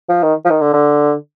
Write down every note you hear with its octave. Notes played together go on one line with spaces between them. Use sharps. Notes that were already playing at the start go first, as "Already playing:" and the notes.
F3
D#3
F3
D#3
D3
D3